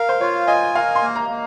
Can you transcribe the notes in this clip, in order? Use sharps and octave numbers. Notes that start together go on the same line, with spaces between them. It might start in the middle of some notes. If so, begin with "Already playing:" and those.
Already playing: A#4 F5
C5
F4 C#5
D#5 G#5
A#4 F5
C6
A#3
A#5
A#3